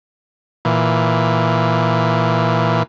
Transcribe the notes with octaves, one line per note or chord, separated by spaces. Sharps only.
A#2 E3